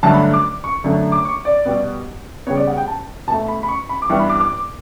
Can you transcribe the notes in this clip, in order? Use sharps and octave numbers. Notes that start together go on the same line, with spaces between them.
G2 D3 F#3 A3 A5
B5
D6
C#6
F#2 D3 A3
D6
C#6
D5
B2 G3 B3
C#3 G3 B3 C#5
D5
F#5
G5
A5
B2 A3 A5
B5
B5
C#6
B5
D6
G2 E3 G3 B3 C#6
B5
D6
D6